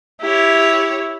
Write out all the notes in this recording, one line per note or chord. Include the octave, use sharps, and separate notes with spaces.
E4 G4 C#5